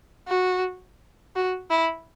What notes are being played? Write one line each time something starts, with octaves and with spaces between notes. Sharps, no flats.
F#4
F#4
E4